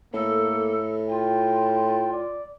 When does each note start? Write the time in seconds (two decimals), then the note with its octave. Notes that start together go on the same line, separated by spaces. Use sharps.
0.14 A2 A#3 A4
1.09 F4 G5
2.12 D5